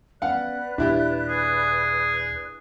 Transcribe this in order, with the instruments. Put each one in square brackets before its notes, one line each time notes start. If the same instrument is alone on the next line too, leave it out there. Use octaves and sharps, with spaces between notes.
[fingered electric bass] B3 C#4 [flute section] B4 D5 F#6 [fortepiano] F5 F#5
[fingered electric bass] D#2 A#2 [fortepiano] D4 E4 G4
[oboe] G#4